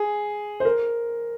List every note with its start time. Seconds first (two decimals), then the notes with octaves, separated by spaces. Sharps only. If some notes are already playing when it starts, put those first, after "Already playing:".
Already playing: G#4
0.60 C5
0.65 A#4